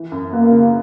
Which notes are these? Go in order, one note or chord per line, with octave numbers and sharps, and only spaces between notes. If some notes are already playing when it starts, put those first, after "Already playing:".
Already playing: E3
F#2
A#3 B3
C#3